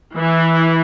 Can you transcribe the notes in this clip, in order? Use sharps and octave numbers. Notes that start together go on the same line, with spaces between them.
E3